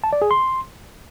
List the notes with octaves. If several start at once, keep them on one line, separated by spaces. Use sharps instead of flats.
A5
D5
G#4
C6